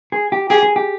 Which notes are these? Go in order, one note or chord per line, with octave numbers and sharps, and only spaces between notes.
G#4
G4
G4 G#4
G#4
G4